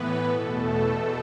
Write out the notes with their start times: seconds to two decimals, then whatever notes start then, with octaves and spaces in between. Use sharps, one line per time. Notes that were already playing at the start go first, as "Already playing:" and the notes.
Already playing: A2 E3 B3 B4
0.25 E2 B2 A3 A4